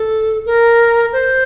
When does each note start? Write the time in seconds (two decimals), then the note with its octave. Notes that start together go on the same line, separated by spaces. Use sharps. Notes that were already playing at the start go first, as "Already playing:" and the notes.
Already playing: A4
0.46 A#4
1.13 C5